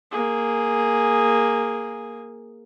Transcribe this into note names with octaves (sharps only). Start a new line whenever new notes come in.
A#3 G#4